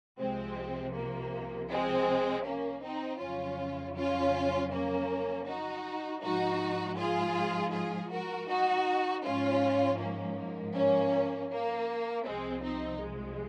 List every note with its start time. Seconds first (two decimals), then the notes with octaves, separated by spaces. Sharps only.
0.18 C2 C3 F3 G#3 C4
0.94 A#3
1.69 G#3 C4
2.44 A#3 C#4
2.83 C4 D#4
3.20 F2 C#3 F#3 C#4 F4
3.95 C#4 F4
4.71 A#3 C#4
5.47 D#4 F#4
6.22 G#2 F3 D#4 F#4
6.97 F4 G#4
7.73 F4 G#4
8.11 F#4 A#4
8.48 D#4 F#4
9.24 G#2 F3 C#4 F4
9.99 A#3 C#4
10.37 A#3
10.74 A#3 C#4
11.50 A#3
12.25 C2 C3 F3 G#3 C4
12.63 C4 D#4
13.00 G#3